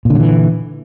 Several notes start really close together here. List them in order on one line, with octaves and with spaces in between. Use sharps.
A#2 D3 F#3 E3